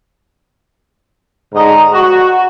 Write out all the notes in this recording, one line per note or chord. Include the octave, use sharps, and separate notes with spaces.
G#2 D3 D#5 A#5
F#4